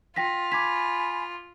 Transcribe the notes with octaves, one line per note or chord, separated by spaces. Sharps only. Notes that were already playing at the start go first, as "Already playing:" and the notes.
F4 G5 A#6 B6
G#5 B5 D6 G#6 B6